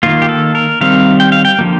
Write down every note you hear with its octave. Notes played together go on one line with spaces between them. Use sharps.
D#3 A#3 F4
G4
A4
A#4
D#3 G3 C4 F5
G5
F5
G5
D3 F3 A#3